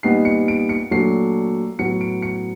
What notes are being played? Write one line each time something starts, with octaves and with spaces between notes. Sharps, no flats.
A#2 G3 B3 D#4 C7
C#7
D7
C#7
A#2 F#3 A3 D4 C7
A2 F#3 B3 C#7
D7
C#7